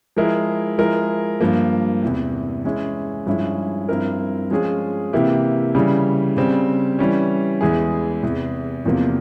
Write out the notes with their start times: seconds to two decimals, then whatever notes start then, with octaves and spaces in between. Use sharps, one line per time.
0.17 F3 G#3 E4 A#4
0.78 F3 G#3 E4 A#4
1.40 G2 F3 A#3
2.02 E2 C3 E3
2.65 E3 G#3 C#4 E4
3.26 G2 F3 G#3 C#4 E4
3.89 G2 F3 C4 E4 A#4
4.51 F3 G#3 C#4 F4 G#4
5.13 C3 E3 A#3 E4 G4
5.75 C#3 E3 G3
6.37 C#3 G3 C4
6.99 E3 G3 C#4
7.61 E2 E3 G#3 E4 G#4
8.23 E2 C3 E3
8.85 E2 C3 F3 A#3 F4